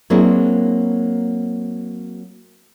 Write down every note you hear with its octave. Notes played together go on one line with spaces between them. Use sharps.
F#3 A#3 C4 D4 E4 G#4